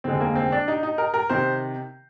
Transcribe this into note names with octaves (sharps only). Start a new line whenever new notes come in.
F1 D#2 D3 G#3 C4
A#3
C4
D4
D#4
D#4
A#4
A#4
C3 D#3 C5